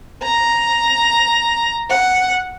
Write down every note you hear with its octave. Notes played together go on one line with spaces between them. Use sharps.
A#5
F#5